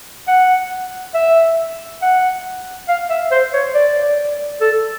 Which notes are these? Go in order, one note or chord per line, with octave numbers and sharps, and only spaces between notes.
F#5
E5
F#5
F5
E5
C5
C#5
D5
A4